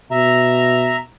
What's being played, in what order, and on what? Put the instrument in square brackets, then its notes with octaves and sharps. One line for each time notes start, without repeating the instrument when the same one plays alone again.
[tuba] B2 [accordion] E5 A#5